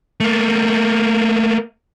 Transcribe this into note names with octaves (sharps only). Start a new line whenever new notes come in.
A3 A#3